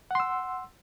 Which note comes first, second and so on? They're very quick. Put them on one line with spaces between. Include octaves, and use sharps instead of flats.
F#5 C6 E6